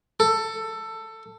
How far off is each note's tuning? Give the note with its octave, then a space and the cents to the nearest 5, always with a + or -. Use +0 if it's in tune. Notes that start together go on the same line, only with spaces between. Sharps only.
A4 +15